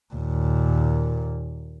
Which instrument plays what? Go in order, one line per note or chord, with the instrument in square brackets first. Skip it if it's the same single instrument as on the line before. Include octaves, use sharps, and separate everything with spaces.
[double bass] D#2 A#2